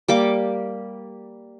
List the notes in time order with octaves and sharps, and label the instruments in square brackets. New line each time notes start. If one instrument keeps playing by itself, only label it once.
[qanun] G3 A#3 D6